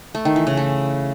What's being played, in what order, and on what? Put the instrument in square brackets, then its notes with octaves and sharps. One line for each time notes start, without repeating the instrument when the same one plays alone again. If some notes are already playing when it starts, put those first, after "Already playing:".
[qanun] A3
D#3
E3
C#3
A3